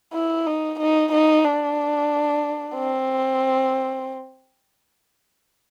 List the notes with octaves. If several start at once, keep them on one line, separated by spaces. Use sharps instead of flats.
E4
D#4
D#4
D#4
D4
C4